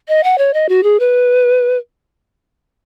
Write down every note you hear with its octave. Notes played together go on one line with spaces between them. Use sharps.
D#5
F#5
C#5
D#5
F#4
G#4
B4